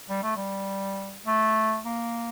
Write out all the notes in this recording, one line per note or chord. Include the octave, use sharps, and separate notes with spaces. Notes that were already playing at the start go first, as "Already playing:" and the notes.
G3
A3
G3
A3
A#3